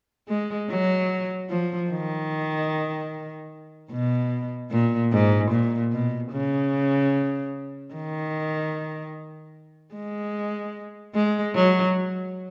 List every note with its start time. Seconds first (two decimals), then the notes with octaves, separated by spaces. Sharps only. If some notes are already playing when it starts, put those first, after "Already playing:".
0.28 G#3
0.70 F#3
1.50 F3
1.90 D#3
3.91 B2
4.71 A#2
5.12 G#2
5.51 A#2
5.92 B2
6.32 C#3
7.94 D#3
9.95 G#3
11.15 G#3
11.55 F#3